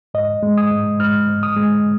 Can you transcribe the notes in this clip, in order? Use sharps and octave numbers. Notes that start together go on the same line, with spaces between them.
G#2 D#5
G#3
D#6
G#2
G#2 F6
G#2
D#6
G#3